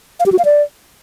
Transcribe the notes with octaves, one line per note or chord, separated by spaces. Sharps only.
F5
G4
F#4
F5
D5